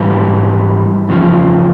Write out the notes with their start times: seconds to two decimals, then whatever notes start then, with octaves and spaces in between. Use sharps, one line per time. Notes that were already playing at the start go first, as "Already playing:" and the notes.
Already playing: G#2 E3 G3
1.09 E2 C#3 F3